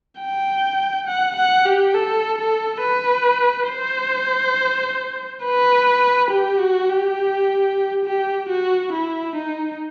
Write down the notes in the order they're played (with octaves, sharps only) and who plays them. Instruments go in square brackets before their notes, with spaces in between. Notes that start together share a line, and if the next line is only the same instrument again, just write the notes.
[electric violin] G5
F#5
F#5
G4
A4
A4
B4
C5
B4
G4
F#4
G4
G4
F#4
E4
D#4